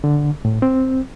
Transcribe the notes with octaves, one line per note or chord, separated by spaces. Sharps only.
D3
A2
C4